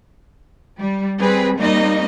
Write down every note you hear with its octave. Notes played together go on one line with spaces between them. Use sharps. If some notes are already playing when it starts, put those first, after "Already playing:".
G3
G3 C4 G#4 B4
G3 A#3 C4 D#4 D#5